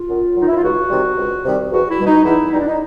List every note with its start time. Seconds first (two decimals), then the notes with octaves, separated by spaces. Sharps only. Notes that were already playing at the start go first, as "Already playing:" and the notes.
Already playing: F4
0.10 F#2
0.37 D#3 F#3 D#4
0.48 E4
0.57 F4
0.63 C#2 F#4
0.90 C3 D#3 G3
1.18 C#2
1.45 C3 D#3 G3
1.72 E2 F#4
1.90 E4
1.98 B2 G3
2.07 D#4
2.25 E2 E4
2.52 B2 G3 D#4
2.60 D4
2.68 D#4